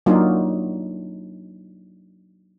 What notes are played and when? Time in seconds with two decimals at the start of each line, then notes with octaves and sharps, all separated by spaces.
0.06 F#3 A#3 D4 D#4 F4